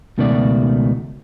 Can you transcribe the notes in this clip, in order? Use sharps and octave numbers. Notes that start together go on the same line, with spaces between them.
C#2 B2 D#3 A3 F#4 D5